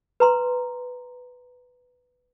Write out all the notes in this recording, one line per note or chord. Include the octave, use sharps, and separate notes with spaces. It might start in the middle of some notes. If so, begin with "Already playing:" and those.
B4 A#5 C6